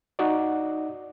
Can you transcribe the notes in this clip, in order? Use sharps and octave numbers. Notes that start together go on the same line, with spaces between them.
D#4 F#4 D5